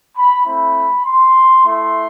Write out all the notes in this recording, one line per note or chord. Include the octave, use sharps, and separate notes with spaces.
B5
A3 C4 E4 B5
C6
A3 E4 C6